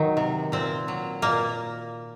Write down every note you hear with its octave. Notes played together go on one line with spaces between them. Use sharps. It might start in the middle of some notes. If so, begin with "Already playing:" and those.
Already playing: D#3 F#3 D#4
C3
A#2 C4
F#3
A#2 A#3